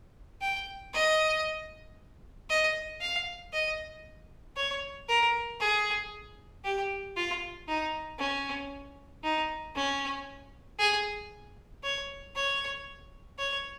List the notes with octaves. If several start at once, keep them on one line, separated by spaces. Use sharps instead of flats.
G5
D#5
D#5
F5
D#5
C#5
A#4
G#4
G4
F4
D#4
C#4
D#4
C#4
G#4
C#5
C#5
C#5